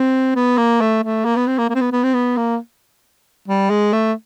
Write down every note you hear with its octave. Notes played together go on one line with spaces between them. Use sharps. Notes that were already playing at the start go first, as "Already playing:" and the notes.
Already playing: C4
B3
A#3
A3
A3
A#3
B3
C4
A#3
A#3
C4
B3
B3
C4
B3
A#3
G3
G#3
A3